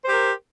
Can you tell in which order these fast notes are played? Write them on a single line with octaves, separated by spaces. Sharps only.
C5 G4 A#4